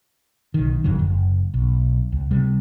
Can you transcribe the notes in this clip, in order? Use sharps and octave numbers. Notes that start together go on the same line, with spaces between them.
B1 D#3
G#1 F2 D3 F#3
F#1
B1
C#2
C3 G3